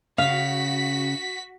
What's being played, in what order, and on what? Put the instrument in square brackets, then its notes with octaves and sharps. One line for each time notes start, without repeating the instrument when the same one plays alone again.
[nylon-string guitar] C#3 [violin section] F#4 B6 [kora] F5